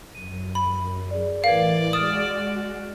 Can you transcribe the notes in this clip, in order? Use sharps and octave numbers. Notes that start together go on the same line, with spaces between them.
F#2 D#7
B5
G#4 D5
A2 E3 A#4 B4 D5 F5 G#6 A6
G#3 F#4 D#6 F6 A6 E7